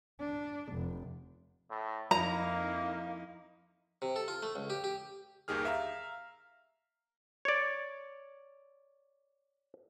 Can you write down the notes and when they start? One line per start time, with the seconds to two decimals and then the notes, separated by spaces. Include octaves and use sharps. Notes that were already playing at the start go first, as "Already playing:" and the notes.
0.20 D4
0.73 F1
1.70 A2
2.11 F2 A#3 D#4 E4 A#5
4.02 C3
4.16 A4
4.28 F4
4.43 A3
4.56 C#2
4.70 G4
4.84 G4
5.48 G1 D#2 D#3 G4 G#4 F6
5.65 E5 F5 A#5
7.45 C#5 D5